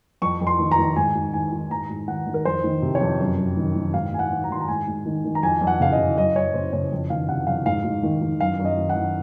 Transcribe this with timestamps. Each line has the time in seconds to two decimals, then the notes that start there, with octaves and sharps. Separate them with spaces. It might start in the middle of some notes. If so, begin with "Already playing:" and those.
0.22 F2 C#6
0.41 F2
0.47 C6
0.59 D#3
0.72 A#5
0.78 D#3
0.96 G#2 G#5
1.15 G#2
1.33 D#3 G#5
1.52 D#3
1.70 G#2 A#5
1.90 G#2
2.08 D#3 F#5
2.27 D#3
2.34 A#4
2.45 F2 C5
2.64 D#3
2.82 C3
2.95 C#5
3.01 F2
3.20 F#2
3.38 F#2
3.57 D#3
3.75 D#3
3.94 G#2 F5
4.12 G#2 G#5
4.19 F#5
4.31 D#3
4.44 A#5
4.50 D#3 C6
4.60 A#5
4.68 G#2 G#5
4.87 G#2
5.06 D#3
5.24 D#3
5.35 A#5
5.43 F2 G#5
5.61 F2
5.67 F#5
5.80 C#3 F5
5.92 D#5
5.98 C#3
6.18 F#2 D#5
6.36 F#2 C#5
6.54 C#3 C5
6.73 C#3 C#5
6.92 F2
7.10 D#3 F5
7.28 C3 F#5
7.47 F2 F5
7.66 G#2 F5
7.84 G#2
8.03 D#3
8.22 D#3
8.40 F#2 F5
8.59 F#2
8.65 D#5
8.78 D#3
8.89 F#5
8.96 D#3